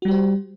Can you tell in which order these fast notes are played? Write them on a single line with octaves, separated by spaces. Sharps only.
F#4 G3 G4 C5